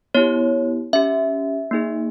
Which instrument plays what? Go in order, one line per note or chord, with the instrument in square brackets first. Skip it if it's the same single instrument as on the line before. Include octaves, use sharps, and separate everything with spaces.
[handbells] B3 E4 G4 C#5
C#4 G4 E5
A#3 D#4 G#4